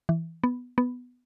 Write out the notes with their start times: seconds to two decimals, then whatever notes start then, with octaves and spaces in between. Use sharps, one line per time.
0.09 E3
0.44 B3
0.78 B3